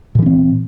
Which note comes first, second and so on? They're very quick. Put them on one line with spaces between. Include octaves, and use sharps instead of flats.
A#2 E3 C#4 C4